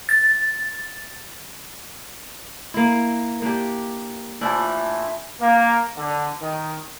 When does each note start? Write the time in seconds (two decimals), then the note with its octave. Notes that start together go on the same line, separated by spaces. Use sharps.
0.09 A6
2.74 A#3 E4
3.42 A#3 D4 G4
4.41 A2 E3 F3 D4
5.40 A#3
5.97 D3
6.41 D#3